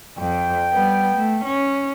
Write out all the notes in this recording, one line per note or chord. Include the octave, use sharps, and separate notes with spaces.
F2 G5
G3 B3
A3
C#4